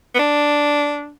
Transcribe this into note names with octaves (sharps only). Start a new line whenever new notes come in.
B3
D4